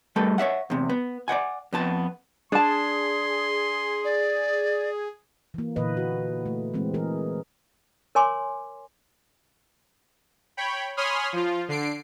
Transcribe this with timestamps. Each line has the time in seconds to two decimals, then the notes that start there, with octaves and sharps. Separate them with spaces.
0.16 G3 A3 G4 A4 B4
0.38 C#5 D5 E5 F#5
0.70 E2 C3
0.90 B3
1.28 D5 D#5 F#5 G#5
1.73 F2 B3 A5
2.52 D4 G#4 A5 C6
4.04 D5
5.54 E3 A#3
5.76 A#2 D3 E3 B4 D#5
5.97 F#4
6.46 A3
6.74 E3 G#3 C4
6.94 E3 G#4 A#4
8.15 A#4 C#5 G#5 C6 D6
10.57 C#5 G5 B5
10.97 C#5 G#5 B5 C6 D#6 F6
11.33 F3 F4
11.68 D3 C7 D7